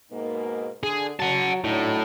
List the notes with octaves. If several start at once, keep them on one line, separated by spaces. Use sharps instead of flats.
G#2 B2 A#3
D3 G#4
F#3 F#5 A5
A2 F#3 D4 D#4